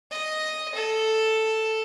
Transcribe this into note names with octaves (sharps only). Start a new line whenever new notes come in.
D#5
A4